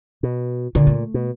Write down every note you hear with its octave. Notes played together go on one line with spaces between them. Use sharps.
B2
A#2 D3
A3
B2